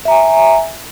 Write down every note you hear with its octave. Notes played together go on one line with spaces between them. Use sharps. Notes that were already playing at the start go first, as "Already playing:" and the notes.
E5 G#5 A#5